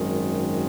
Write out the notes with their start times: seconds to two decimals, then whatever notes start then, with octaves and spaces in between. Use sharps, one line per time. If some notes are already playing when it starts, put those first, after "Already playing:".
Already playing: G#1 F#2 D#3 G#3